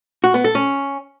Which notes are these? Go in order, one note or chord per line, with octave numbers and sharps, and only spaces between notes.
F#4
B3
A4
C#4